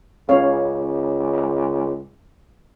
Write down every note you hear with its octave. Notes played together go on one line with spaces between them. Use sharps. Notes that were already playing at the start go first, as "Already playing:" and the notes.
C#2 C#4 C#5 F5